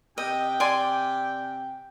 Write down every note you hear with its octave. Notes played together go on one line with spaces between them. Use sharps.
C3 D#5 G5
D5 G#5 C6